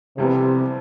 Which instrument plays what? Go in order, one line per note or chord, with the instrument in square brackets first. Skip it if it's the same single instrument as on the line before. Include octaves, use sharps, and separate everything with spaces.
[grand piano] F2 E3 G3 B3 [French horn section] C3